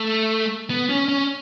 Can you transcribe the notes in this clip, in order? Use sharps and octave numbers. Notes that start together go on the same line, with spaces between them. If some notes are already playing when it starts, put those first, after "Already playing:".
Already playing: A3
B3
C#4
C#4